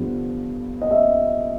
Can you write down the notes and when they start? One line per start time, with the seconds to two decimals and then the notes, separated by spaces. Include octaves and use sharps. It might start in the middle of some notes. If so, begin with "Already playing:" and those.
Already playing: G2 D3 F3 B3
0.82 D#5
0.91 E5